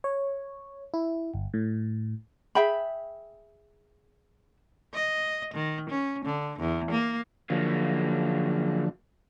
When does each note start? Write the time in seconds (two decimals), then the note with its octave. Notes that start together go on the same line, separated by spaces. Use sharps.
0.04 C#5
0.94 E4
1.34 G1
1.54 A2
2.55 G#4 E5 G5 B5
4.94 D#5
5.54 D#3
5.90 C#4
6.25 D3
6.60 E2
6.91 A#3
7.50 D3 F3 F#3 A#3